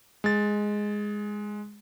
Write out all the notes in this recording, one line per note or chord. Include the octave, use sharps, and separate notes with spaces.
G#3 A6